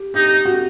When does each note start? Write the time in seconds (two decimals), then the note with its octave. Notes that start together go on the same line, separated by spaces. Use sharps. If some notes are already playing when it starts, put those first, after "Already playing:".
Already playing: G4
0.14 D#4 G4
0.45 F#4